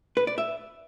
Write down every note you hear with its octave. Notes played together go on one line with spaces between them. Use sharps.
B4
D5
E5